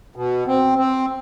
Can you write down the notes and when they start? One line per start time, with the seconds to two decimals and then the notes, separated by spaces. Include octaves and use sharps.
0.16 B2
0.47 C4
0.78 C4